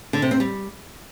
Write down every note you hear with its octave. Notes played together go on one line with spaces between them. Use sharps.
D3
C3
C4
G3